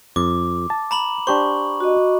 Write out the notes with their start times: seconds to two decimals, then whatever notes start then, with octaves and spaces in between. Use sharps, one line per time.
0.16 F2 D6
0.70 A5
0.91 A#5 B5 F#7
1.27 D4 G4 C5 C#6
1.80 F#4 D#5